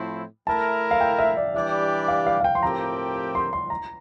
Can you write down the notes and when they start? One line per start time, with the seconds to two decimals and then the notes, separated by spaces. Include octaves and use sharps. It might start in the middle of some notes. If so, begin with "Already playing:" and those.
Already playing: A2 F3 A3 C4 E4
0.47 A3 E4 A#4 A5
0.91 F5
1.00 G5
1.19 E5
1.37 D5
1.54 E3 G3 D4 G4 D5 E5
2.08 F5
2.27 F5
2.40 F5
2.44 G5
2.55 C6
2.62 A2 F3 C4 G4 A#4 A#5
3.35 C6
3.53 C6
3.70 A#5